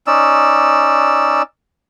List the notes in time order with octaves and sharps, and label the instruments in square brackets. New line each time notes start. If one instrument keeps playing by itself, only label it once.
[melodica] C#4 D#4 D5 E6